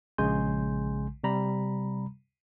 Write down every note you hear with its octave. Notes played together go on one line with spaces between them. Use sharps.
A#1 C#3 G#3 G#5 C6 G6
C3 G3 A#5 B5